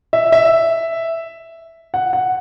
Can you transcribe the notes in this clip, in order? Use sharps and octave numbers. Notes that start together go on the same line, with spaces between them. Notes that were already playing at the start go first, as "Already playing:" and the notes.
E5
E5
F#5
F#5